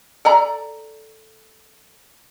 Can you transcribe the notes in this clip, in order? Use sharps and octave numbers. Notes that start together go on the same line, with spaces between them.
A4 D5 A#5